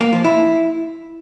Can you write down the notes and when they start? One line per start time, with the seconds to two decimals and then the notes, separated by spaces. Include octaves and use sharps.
0.01 A#3
0.13 F3
0.24 E4